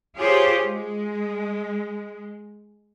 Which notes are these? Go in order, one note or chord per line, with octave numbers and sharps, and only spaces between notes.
F4 G4 G#4 C5 C#5
G#3